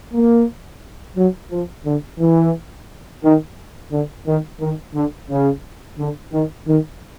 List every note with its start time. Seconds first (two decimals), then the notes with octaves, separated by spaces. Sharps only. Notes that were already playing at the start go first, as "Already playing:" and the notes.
0.14 A#3
1.17 F#3
1.51 F3
1.86 D3
2.20 E3
3.23 D#3
3.92 D3
4.27 D#3
4.60 D#3
4.95 D3
5.29 C#3
5.99 D3
6.33 D#3
6.67 D#3